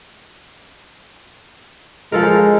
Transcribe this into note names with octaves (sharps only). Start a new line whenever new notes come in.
F3 G#3 A4 A#4